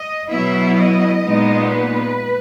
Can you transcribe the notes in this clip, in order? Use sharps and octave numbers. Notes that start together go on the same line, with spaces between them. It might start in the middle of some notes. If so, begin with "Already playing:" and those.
Already playing: D#5
B2 F#3 B3 E4 E5
D#5
A#2 G#3 B3 D#4
B4